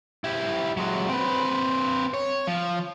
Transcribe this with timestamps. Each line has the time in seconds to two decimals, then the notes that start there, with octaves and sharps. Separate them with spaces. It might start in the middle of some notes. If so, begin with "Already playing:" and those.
0.24 E4 G4
0.77 F#3 G#3
1.09 C4 B4
2.14 C#5
2.47 F3